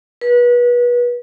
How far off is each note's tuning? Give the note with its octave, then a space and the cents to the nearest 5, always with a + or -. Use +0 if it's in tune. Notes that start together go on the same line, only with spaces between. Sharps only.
B4 -30